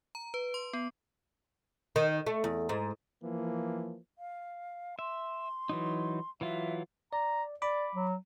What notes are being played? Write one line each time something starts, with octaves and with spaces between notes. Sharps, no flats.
A#5
B4
C6
B3
D#3
A3
E2
G#2
E3 F3 A#3
F5
E5 C6
E3 F#3 D#4
E3 F#3 F4 E5
D5 A#5
D5 B5 D6
F#3